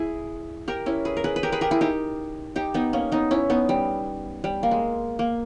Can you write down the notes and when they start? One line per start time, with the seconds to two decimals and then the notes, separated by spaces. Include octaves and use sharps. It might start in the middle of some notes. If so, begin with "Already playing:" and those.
Already playing: E4 G#4
0.68 G4 A#4
0.86 C#4 E4
1.05 G#4 B4
1.17 A#4
1.24 G#4 B4
1.36 B4
1.43 G4 A#4
1.52 G#4 B4
1.61 G4 A#4
1.71 E4 G#4
1.81 D#4 G4
2.56 D#4 G4
2.74 B3 D#4
2.93 A#3 C#4
3.12 B3 D#4
3.31 C#4 E4
3.50 B3 D#4
3.69 G3
4.44 G3
4.63 A#3
4.71 G#3
5.19 A#3